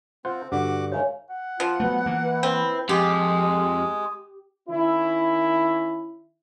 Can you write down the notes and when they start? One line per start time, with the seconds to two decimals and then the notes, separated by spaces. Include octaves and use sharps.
0.25 C4 F4 C5 F#5
0.52 G2 D3 F#4 F#5 D6
0.92 G#2 D#3 F#4 C#5 E5 F5 G#5
1.30 F#5
1.60 F3 F4
1.80 F#3 A3 B3
2.06 E3 A#3
2.24 E4 B4
2.43 C4
2.89 F2 G#3 G4 D#6
4.69 D#3 C#4 E4